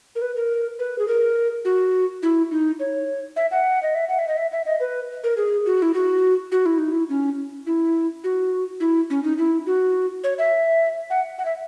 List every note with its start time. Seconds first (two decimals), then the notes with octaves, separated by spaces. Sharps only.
0.16 A#4
0.22 B4
0.36 A#4
0.79 B4
0.99 G#4
1.08 A#4
1.65 F#4
2.23 E4
2.51 D#4
2.80 C#5
3.36 E5
3.51 F#5
3.83 D#5
3.95 E5
4.09 F#5
4.19 E5
4.28 D#5
4.37 E5
4.52 E5
4.66 D#5
4.80 B4
5.24 A#4
5.37 G#4
5.66 F#4
5.82 E4
5.94 F#4
6.52 F#4
6.66 E4
6.78 D#4
6.92 E4
7.09 C#4
7.67 E4
8.24 F#4
8.80 E4
9.10 C#4
9.24 D#4
9.38 E4
9.66 F#4
10.24 C#5
10.38 E5
11.10 F#5
11.38 F#5
11.45 E5